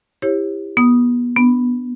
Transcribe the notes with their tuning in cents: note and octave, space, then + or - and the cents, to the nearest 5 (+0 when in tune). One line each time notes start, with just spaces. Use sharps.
E4 +0 G4 +20 C#5 -40
B3 -30 D#6 +0
B3 +0 D4 +10